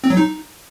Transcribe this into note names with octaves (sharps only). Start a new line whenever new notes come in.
C4
F#3
D#4